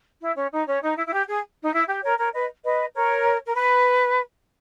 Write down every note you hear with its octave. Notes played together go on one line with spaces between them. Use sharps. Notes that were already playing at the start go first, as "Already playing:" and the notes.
E4
C#4
D#4
C#4
D#4
E4
E4
G4
G#4
D#4
E4
G4
A#4 C#5
A#4 C#5
B4 D#5
B4 D#5
A#4 C#5
A#4
B4